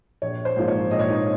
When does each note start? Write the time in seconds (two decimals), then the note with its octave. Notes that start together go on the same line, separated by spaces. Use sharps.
0.22 A#1 C#5
0.45 C5
0.57 G#2 F3 A#3
0.68 C#5
0.90 A#1 D#5
0.99 C#5
1.09 D#4 D#5